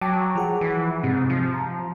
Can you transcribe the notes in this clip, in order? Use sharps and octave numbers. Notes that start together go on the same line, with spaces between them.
F#3 G5 A5 D6
F3 G#4 F#5
E3
G#2 C3
F3
A#5